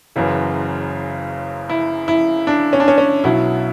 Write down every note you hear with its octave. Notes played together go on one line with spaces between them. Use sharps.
F#1 F#2 C#3 E3
E4
E4
D4
C#4
D4
C#4
C#4
B1 B2 F#3 E4